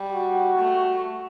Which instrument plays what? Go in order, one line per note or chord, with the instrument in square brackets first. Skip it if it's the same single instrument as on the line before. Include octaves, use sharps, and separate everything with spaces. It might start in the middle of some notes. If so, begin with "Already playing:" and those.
Already playing: [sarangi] G3
[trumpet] F#4
[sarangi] A3